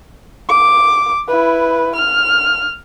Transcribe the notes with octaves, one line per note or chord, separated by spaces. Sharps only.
D6
E4 B4
F6